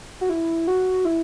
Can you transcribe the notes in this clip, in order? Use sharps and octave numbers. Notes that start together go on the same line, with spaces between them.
F#4
E4
F#4
E4